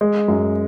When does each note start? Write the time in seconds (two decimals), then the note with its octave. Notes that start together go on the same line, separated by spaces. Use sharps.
0.01 G#3
0.28 F#2